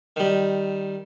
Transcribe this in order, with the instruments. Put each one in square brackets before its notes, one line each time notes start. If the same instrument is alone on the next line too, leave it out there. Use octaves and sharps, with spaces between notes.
[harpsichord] D#3 G3